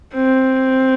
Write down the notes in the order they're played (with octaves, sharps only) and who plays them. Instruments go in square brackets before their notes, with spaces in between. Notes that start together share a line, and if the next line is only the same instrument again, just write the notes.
[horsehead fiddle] C4